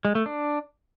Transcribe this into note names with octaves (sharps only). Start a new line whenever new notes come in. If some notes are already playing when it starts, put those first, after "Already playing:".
G#3
A3
D4